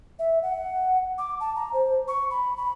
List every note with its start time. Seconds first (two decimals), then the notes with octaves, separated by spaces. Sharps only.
0.19 E5
0.42 F#5
1.18 D6
1.40 A5
1.56 A#5
1.73 C5
2.08 C#6
2.31 B5
2.57 B5